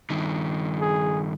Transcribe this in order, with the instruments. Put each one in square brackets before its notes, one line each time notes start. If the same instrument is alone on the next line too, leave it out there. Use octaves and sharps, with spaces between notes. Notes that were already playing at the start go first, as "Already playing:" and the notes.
[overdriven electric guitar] G2 D#3
[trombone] G#4